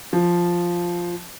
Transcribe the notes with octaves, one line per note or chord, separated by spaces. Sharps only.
F3